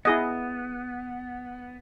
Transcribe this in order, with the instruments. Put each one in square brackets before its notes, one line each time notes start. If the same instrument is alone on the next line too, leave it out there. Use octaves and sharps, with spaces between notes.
[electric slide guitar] B3 [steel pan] E4 G#4 D#5